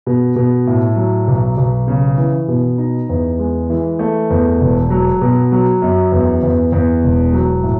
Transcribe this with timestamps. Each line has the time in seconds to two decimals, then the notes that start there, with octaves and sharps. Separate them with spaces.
0.07 B2
0.36 B2
0.67 A2
0.96 F#3
1.28 B1
1.57 B1
1.88 C#3
2.18 E3
2.48 B2
2.78 D#4
3.09 E2
3.39 G#3
3.70 E3
3.99 A3
4.30 E2
4.61 E1
4.90 F#3
5.21 B2
5.52 F#3
5.82 F#2
6.12 E2
6.43 E2
6.72 E2
7.03 E1
7.33 F#3
7.63 A2